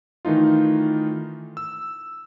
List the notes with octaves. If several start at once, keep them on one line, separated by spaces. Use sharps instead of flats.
D#3 E3 A3 D#4 F4
E6